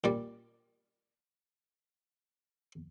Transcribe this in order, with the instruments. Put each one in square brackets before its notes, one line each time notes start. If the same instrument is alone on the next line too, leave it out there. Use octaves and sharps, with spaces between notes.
[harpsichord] A#2 G3 D5